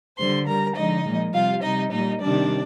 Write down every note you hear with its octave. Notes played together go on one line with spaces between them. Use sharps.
D3 G3 C5 C6
D3 G3 A#4 A#5
D3 F3 G#3 D#4 D#5
A#2 F3 G#3
C3 G3 F4 F5
C3 G3 D#4 D#5
A#2 G3 D#4 D#5
C3 D#3 G3 D4 D5